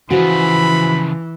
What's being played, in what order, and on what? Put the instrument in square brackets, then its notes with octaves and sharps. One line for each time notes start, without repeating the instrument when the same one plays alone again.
[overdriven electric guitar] C#3 F3 [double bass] E3 [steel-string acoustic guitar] F#4 C5 [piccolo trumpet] B5